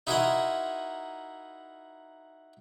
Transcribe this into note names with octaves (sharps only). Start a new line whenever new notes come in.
D#4 E4 F#4 A#4 G#5 C6